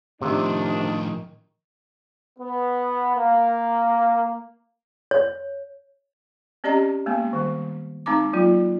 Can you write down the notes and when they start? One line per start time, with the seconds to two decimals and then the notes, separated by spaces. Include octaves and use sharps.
0.21 A2 C3 D#3 F3 D4
2.38 B3
3.16 A#3
5.11 C#5
6.64 C4 C#4 G4 D5 D#5 A#5
7.06 G#3 A#3 B3
7.33 D#3 G3
8.06 G#3 C4 D#4 A#5 D6
8.33 F#3 A#3 F4